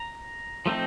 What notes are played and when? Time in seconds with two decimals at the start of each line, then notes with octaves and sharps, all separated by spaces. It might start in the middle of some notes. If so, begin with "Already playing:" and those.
Already playing: A#5
0.66 F3 A3 C4 D#4